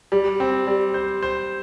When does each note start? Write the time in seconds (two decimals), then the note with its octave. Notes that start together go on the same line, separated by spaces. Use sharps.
0.12 G3
0.40 C4
0.67 G3
0.94 C5
1.23 C5